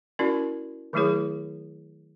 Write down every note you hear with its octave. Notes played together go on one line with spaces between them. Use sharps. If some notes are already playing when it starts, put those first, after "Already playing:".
C#4 E4 F#4 A#4 D5
D#3 F#3 A3 E4 G#4 C#5